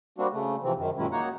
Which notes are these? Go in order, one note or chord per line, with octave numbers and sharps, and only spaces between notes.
G3 A#3 C4 D4 F#4
C#3 A3
C3 E3 F3 C4
F#2 D#3
A#2 D#3 F#3 G#3 C#4 E4
A#3 D#4 F#4 C#5 F#5